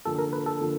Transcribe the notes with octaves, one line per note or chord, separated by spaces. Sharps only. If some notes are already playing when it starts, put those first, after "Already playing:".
D3 F3 A#3 A4
A#4
B4
A4
D3 F3 A#3